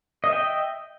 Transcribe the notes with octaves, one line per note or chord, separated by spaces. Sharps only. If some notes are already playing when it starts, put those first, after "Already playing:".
D#5 E5 G5